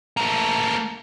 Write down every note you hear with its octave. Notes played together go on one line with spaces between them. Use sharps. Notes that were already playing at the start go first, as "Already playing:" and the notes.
A3 A#3